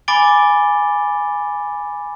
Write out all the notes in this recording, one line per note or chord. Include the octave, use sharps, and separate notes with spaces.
G#5 B5 D6 A6 D7 G7